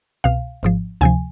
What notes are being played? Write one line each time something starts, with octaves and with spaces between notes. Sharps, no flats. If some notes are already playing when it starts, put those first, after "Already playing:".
C2 B2 F5
G#1 G#2 F3
D2 C3 F3 G#5